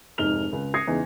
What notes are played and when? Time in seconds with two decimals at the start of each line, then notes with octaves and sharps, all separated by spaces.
0.18 F1 G#2 D#4 F6 F7 G7
0.52 C#2
0.74 D#6 G#6 A#6 C7 C#7
0.88 E2 C#3 D#4